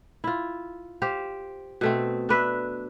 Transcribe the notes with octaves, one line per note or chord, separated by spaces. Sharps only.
E4 F4
G4 C5 F5
B2 A3 C4
D4 B4 E5